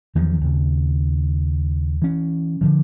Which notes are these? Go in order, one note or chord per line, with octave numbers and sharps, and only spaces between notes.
E2 D#3 F3 F#3
D#2 C#3
E3 C#4
D3 D#3 F3